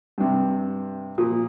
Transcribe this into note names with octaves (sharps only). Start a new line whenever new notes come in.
G2 C3
A#2 F3 D#6